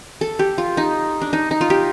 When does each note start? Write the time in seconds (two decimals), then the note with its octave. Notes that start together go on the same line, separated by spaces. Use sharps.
0.21 A4
0.39 G4
0.58 F4
0.77 D#4
1.21 D4
1.33 D#4
1.51 D#4
1.61 F4
1.70 G4